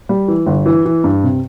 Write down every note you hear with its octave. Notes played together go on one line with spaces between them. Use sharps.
G3
E3
G1
E3
E3
G2
C3